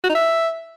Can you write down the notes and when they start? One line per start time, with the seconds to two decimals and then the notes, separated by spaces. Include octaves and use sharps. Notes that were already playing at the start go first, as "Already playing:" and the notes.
0.04 F#4
0.09 D#4
0.15 E5